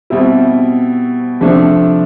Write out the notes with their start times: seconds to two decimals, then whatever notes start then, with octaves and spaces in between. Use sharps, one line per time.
0.10 B2 G3 C4 E4
1.41 C3 F3 A3 D4